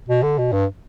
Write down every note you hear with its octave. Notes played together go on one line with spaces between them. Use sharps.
B2
D3
B2
G2